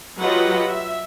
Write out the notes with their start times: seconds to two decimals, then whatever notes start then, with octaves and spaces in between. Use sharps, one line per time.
0.21 F#3 F4 G4 B4 D#5 F#5
0.70 E5